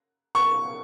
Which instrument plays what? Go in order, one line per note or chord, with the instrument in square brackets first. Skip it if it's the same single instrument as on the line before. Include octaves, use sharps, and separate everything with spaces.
[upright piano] C#6